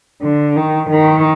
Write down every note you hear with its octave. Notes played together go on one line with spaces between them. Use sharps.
D3
D#3
D#3